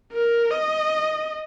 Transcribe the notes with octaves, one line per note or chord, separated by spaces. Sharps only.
A#4
D#5